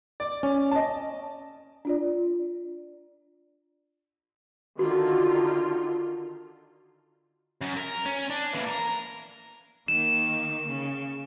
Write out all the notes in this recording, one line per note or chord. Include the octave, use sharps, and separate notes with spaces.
D5
C#4
D#5 A5
D4 F4 D5
D3 D#3 F4 F#4
F#2
A#4
C#4
D4
A#2 E3
A#4
D#3 A#3 E7
C#3